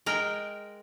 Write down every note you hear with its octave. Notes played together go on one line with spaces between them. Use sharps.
G#3 A#4 G5